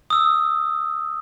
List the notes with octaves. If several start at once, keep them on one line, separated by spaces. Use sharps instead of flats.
D#6 E6